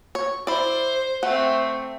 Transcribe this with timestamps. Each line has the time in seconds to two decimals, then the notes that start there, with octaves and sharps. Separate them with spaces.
0.15 C#5
0.47 E4 C5 D5
1.23 A3 C4 F#5